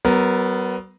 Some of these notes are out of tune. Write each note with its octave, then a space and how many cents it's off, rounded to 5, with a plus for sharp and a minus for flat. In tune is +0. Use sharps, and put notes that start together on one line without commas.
F#3 +45 B3 +10 A#4 +0